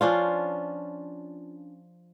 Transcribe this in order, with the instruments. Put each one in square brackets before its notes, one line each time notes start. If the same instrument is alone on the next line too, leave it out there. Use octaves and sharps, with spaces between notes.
[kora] F3 C#4 D4 F4